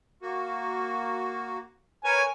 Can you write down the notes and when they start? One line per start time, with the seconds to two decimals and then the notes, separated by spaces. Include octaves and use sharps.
0.22 A#3 F#4
2.04 A#4 B4 C#5 G#5